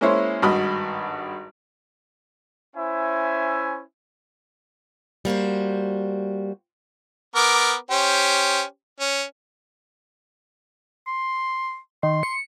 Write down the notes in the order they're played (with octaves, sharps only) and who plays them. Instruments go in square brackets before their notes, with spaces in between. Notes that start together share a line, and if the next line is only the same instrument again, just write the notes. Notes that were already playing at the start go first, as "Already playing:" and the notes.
[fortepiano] G#3 A#3 C#4 E4 C5 C#5
G#1 G2 F#4 D#5 B5 D#6
[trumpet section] C#4 E4 C5 E5 G#5
[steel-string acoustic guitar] G3 A#3 F#4 C5
[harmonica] B3 A#4 D6
C#4 G4 C5
C#4
[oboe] C6
[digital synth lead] D#3 [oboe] C6
[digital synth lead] C#7